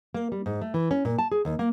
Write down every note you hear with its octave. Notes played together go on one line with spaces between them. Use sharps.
A#3
G3
G#2
A3
E3
C#4
A#2
A5
G#4
D#2
A#3